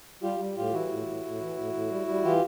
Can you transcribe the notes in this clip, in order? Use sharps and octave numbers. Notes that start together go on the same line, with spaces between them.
G3 F4 G4
G3
A2 F4 G4
E3 E4 F#4
A2
A2
A2
E3
A2
A2
G3
G3
E3 F4 G4